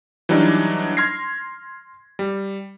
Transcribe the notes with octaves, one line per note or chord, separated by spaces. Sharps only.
E3 F#3 G3 D4 D#4
C6 F6 G#6 A#6 C7
G3